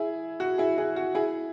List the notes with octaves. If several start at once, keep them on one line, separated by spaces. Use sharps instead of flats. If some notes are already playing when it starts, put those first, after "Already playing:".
Already playing: E4 G#4
F#4
E4 G#4
E4 G#4
F#4
E4 G#4